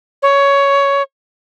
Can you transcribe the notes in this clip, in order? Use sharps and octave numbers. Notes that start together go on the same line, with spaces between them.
C#5